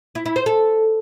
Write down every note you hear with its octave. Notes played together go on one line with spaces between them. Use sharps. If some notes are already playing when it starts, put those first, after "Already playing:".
E4
E4
C5
A4